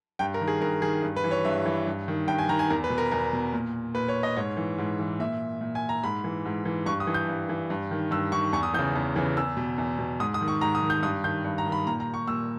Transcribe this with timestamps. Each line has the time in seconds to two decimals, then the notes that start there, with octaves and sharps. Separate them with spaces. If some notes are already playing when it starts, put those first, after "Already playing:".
0.19 G2 G5
0.34 A#4
0.41 D#3
0.48 G#4
0.61 G2 A#4
0.82 D#3 G#4
1.03 G2
1.16 B4
1.24 E3
1.31 C#5
1.45 G2 E5
1.66 E3
1.87 G2
2.08 D#3
2.28 G2 G5
2.39 G#5
2.49 D#3 A#5
2.59 G#5
2.70 E2 A#4
2.84 B4
2.90 B2
2.98 A#4
3.11 E2 A#4
3.33 B2
3.53 A#2
3.95 A#2 B4
4.08 C#5
4.23 D#5
4.37 G#2 C#5
4.57 E3
4.78 G#2
4.99 E3
5.20 A#2 E5
5.61 A#2
5.75 G#5
5.89 A#5
6.03 G#2 B5
6.24 E3
6.45 G#2
6.65 E3
6.86 G2 C#6
7.00 D#6
7.07 E3
7.14 G6
7.29 G2
7.49 E3
7.70 G2
7.91 D#3
8.11 G2 E6
8.32 D#3 C#6
8.53 E2 C#6
8.63 D#6
8.74 E3 G6
8.79 C#3
8.95 E2
9.16 C#3 E3
9.37 E2 E6
9.57 B2
9.78 E2
9.99 B2
10.20 G#2 D#6
10.34 D#6
10.41 D#3
10.48 C#6
10.61 G#2 A#5
10.75 D#6
10.82 D#3
10.90 G6
11.03 G2 D#6
11.24 D#3 G6
11.45 G2
11.58 A#5
11.66 D#3
11.72 B5
11.86 A#2 A#5
12.00 A#5
12.14 C#6
12.28 A#2 E6